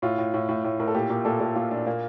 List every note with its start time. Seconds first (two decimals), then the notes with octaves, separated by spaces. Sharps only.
0.02 A2 F4
0.18 A2
0.34 A2
0.49 A2
0.64 A2
0.79 A2 A#4
0.88 A4
0.94 A#2 G4
1.10 A#2 A#4
1.25 A#2 A4
1.40 A#2 A4
1.56 A#2 F4
1.71 A#2 D4
1.86 A#2 A#3